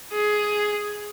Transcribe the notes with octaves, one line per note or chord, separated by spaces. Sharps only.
G#4